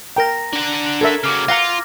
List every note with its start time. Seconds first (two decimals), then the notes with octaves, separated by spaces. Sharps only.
0.16 A#4 G5 A#5 A#6
0.53 D4 F#5
1.01 A4 A#4 E5 G#6
1.23 C#3 F#3 D6 F6
1.48 F4 F5 F#5 A#5 A#6